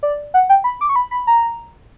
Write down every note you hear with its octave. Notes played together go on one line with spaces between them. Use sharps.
D5
F#5
G5
B5
D6
C#6
B5
B5
A#5